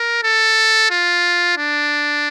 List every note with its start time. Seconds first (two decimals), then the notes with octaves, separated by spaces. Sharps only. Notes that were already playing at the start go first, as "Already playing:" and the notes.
Already playing: A#4
0.24 A4
0.91 F4
1.58 D4